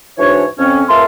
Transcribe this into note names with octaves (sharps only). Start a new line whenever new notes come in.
G#2 E3 D4 F#4 C#5
F2 C4 C#4
C#2 A#3 A#4 E5 A5 C6